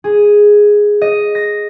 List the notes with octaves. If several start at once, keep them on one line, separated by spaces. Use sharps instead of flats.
G#4
D#5
A#6